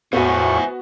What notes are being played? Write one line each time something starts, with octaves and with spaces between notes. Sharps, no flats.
E2 A2 B3 F#4 C5 E5 G#5 C#6